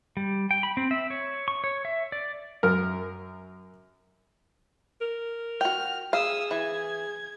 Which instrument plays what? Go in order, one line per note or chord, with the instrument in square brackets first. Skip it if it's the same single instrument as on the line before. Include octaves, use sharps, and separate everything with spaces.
[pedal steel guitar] G3
G5
B5
C4
E5
C#5
C#6
C#5
E5
D5
[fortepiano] F#2 A#4
[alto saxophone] A#4
[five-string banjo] F#4 G5 [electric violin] F6
[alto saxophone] G#4 [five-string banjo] F5 [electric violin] D#6 E6
[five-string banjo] E3 [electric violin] G#6